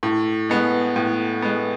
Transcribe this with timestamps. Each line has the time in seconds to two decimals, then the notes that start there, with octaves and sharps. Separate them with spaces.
0.03 A2
0.50 G#3 B3
0.96 A2
1.42 G#3 B3